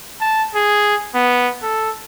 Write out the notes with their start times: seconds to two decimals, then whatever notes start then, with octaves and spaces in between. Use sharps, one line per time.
0.21 A5
0.55 G#4
1.15 B3
1.63 A4